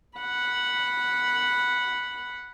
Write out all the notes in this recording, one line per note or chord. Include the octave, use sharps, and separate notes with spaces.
F#5 B5